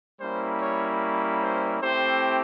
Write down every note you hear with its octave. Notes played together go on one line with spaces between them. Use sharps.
G3 A#3 C#4 E4 C5
C#5
C#5
C5
A3 C4 E4 G4 C5